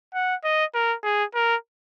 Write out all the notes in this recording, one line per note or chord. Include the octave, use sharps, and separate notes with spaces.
F#5
D#5
A#4
G#4
A#4